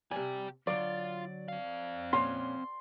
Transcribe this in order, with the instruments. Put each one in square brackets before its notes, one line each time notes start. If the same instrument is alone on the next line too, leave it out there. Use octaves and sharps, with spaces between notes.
[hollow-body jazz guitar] C3 G#5 [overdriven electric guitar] G4 D5
[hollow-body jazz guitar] D3 F#3 [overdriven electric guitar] F4 [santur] D5
[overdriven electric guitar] C4 F5
[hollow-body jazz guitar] A#2 C#4 [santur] C6